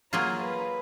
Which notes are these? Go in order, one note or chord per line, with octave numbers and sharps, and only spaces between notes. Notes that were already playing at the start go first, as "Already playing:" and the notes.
F#3 A#3 F4 G#4 A#5
B4